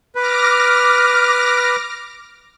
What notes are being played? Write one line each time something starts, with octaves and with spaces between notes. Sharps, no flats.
B4 D6 F6 A#6